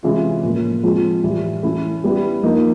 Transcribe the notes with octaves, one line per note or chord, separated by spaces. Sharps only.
C3 E3 G#3 C#4 F4
A2 F3 A#3
F3 G#3 C4 F4
A2 E3 G3
E3 A3 C#4 E4
G3 B3 E4
F3 A#3 D#4